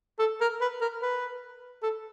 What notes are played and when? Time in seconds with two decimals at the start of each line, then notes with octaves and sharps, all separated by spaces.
0.19 A4
0.41 A#4
0.61 B4
0.81 A#4
1.02 B4
1.83 A4